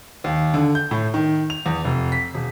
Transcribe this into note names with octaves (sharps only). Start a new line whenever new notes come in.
D#2
D3
G6
A2
D#3
F7
E2
F1
B6
E1